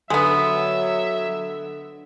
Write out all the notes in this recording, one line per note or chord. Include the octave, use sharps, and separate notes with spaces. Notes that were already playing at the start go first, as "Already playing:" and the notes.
D3 F#3 G#3 B3 E5